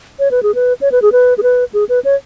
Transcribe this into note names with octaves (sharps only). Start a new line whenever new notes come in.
C#5
B4
G#4
B4
C#5
B4
G#4
B4
G#4
B4
G#4
B4
C#5